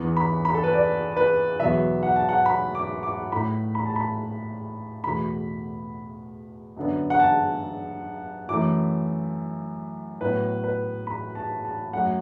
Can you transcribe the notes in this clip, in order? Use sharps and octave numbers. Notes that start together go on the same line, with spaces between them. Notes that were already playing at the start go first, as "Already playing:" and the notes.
Already playing: E2 E3 B3
B5
B5
A4
B4
D5
B4
E2 B2 F#3 B3 E5
F#5
A5
F#5
B5
D6
D6
A2 A3 B5
B5
A5
B5
E2 B2 A3 B5
F#2 D3 B3
F#5
A5
F#2 E3 A3 D6
A2 F#3 B3 B4
B4
B5
A5
A5
F#2 F#3 A3 F#5